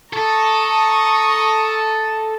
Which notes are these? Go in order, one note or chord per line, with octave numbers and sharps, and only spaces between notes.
A4 A#5 C#6 D#6